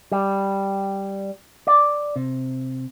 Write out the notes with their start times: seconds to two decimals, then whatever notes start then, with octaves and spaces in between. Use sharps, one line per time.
0.12 G3
1.67 D5
2.16 C3